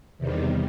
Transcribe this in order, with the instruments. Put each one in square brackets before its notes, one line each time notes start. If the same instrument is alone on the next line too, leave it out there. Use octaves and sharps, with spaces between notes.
[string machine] E2 C3 D#3 G3